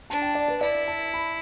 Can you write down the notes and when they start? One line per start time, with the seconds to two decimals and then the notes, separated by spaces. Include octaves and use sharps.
0.10 D4 A5
0.22 G5
0.35 D5
0.48 B4
0.61 E4 D5
0.88 A5
1.14 B5